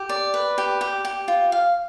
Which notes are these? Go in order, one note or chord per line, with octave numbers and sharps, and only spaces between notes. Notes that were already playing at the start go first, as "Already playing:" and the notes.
Already playing: G4
D5
B4
G4
G4
G4
F4
F5